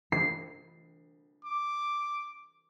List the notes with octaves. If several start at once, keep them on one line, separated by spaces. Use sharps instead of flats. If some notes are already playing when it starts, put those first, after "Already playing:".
C7
D6